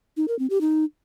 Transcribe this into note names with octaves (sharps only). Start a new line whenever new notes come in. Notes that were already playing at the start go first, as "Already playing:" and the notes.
D#4
A#4
C4
G4
D#4